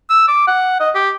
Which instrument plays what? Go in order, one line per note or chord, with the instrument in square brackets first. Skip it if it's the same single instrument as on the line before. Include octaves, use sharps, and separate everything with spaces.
[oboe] E6
D6
F#5
D#5
G4